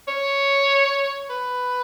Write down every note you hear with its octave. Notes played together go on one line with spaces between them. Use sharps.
C#5
B4